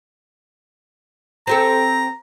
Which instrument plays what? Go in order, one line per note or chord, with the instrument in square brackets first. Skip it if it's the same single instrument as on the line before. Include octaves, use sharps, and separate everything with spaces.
[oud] C4 G4 A4 [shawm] A#5